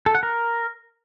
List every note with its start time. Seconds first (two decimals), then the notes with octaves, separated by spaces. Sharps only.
0.06 A4
0.15 F#5
0.23 A#4